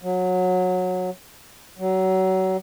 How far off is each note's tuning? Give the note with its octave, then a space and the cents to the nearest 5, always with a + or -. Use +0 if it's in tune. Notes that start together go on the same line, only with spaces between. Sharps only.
F#3 -20
F#3 +25